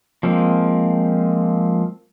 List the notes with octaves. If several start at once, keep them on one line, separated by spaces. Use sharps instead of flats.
F3 G#3 A#3 C4